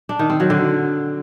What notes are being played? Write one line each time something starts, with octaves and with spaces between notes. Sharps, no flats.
D4
D#3
C4
F#3
D3